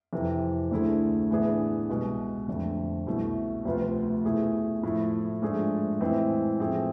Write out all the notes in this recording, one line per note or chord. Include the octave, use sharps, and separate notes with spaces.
F2 C3 E3
D2 D3 A3 E4 G#4
A2 E3 B3 D4 G#4
C2 B2 G#3
F2 D3 A3
C2 B2 A3 E4
D2 C3 F3 B3 F4
B2 A3 E4 G#4
A2 F3 A3 E4
G#2 F3 A3 D4 G#4
A2 E3 G#3 C4
A2 F3 A3 C4 G#4